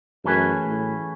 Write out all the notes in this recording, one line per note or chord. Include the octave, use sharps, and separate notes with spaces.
F#2 E3 A3 C#4 G#4 B4
A2